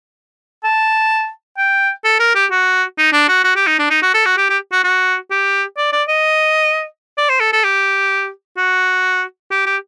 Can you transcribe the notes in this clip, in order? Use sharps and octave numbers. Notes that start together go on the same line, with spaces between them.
A5
G5
A4
A#4
G4
F#4
D#4
D4
F#4
F#4
G4
D#4
D4
D#4
F#4
A4
F#4
G4
G4
F#4
F#4
G4
D5
D5
D#5
D5
C5
A4
A4
G4
F#4
G4
G4